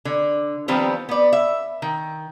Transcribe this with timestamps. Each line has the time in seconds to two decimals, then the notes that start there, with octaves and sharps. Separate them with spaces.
0.05 D3
0.68 D#3 F3 G3 B3 C4
1.09 B3 D5
1.33 E5
1.82 D#3